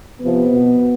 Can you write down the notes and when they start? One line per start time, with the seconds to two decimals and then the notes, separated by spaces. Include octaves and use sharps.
0.20 C3 F3 B3
0.50 B2